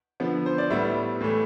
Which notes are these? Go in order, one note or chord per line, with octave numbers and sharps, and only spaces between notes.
D3 F3 B3
C5
D5
A2 G3 B3 E5
A2 E3 A3